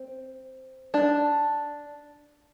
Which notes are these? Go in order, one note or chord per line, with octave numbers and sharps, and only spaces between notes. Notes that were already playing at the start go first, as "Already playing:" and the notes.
Already playing: C4
D4